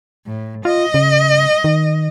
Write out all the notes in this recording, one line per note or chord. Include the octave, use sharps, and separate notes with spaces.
A2
F4 D#5
C#3
D#3